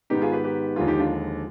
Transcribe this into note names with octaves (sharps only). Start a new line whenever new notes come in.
G#2 D#3 B3 D#4 G4
F4 G#4
G4 B4
G4 B4
D#2 D3 F3 G#3 F4 G#4
D#4 G4
D4 F4